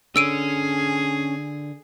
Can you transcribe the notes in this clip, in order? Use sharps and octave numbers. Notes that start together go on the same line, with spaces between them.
D3 C#4 G#4 E6 D7 D#7